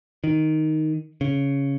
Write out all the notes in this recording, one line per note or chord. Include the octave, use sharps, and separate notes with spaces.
D#3
C#3